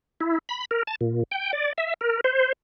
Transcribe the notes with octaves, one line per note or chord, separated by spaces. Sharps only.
E4
B5
A#4
A5
A#2
G5
D5
E5
A#4
C5